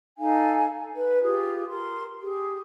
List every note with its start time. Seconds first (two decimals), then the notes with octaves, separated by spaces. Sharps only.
0.18 D#4 A4 F5 G#5
0.95 B4
1.22 F4 G4 G#4
1.68 A#4 C6
2.20 G4 G#4